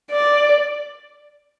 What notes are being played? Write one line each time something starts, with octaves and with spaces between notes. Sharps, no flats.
D5